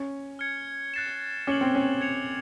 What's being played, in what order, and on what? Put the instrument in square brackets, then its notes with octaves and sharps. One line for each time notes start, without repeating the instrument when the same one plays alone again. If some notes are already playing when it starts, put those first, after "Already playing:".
Already playing: [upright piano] C#4
[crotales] F6 G#6 C#7
F#6 A6 C7 E7
[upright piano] C#4 [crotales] D6 F6 A6 D7 F#7
[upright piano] C4
C#4
[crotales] G#6 C#7 F7